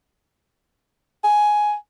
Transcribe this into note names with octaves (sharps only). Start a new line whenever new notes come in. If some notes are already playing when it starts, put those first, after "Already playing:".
G#5